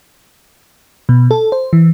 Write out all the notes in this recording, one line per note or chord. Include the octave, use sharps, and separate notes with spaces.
B2
A4
C5
E3